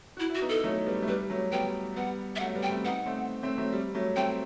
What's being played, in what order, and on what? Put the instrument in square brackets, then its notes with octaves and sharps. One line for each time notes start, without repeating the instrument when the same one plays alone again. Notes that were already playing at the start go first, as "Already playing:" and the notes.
[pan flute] E4 [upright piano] F#4
[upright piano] E4
[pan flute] F#4
[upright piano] B3 D#4
[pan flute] A4
[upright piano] F#3 A3
G3 B3
A3
[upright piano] G3 [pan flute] B4
[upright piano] F#3 A3
[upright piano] G3 B3 [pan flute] G5
[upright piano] G3 B3 [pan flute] F#5
[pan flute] E5
[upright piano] F#3 A3 [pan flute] F#5
[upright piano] G3 B3
[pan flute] G5
[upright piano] A3 C4
[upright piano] B3 D#4 [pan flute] F#5
[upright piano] A3 C4
A3 C4
F#3 A3
G3
F#3 A3
[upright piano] A3 C4 [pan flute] G5